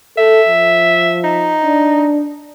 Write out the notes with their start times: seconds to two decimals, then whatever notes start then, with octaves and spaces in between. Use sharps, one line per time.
0.18 A4 E5
0.48 F3
1.24 D#4
1.64 D4